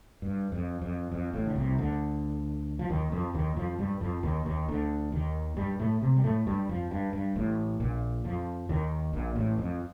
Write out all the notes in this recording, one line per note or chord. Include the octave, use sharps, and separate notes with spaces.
G2
F2
F2
F2
A1 A2
D3
C2 C3
D2 D3
F3
D#2 D#3
F2 F3
D#2 D#3
F2 F3
G2 G3
F2 F3
D#2 D#3
D#2 D#3
D2 D3
D#2 D#3
G2 G3
A2 A3
C3 C4
G3
A2 A3
G2 G3
F2 F3
G2
G2
A1 A2
A#1 A#2
F2 F3
D#2 D#3
A#1 A#2
A1 A2
F2